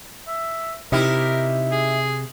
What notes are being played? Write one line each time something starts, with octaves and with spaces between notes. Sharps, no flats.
E5
C3 D#4 E4 G4 A#4
G#4